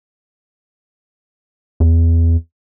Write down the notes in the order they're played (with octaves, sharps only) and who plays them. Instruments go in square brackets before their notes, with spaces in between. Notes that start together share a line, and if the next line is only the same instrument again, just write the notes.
[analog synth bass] E2